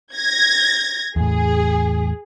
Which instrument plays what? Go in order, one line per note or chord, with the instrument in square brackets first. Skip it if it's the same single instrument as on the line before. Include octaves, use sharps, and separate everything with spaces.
[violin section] G#6 A#6
[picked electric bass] E2 A2 [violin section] G#4